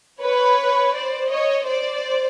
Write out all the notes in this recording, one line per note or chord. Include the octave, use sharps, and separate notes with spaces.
B4 C#5
C5 D5
C#5 D#5
C5 D5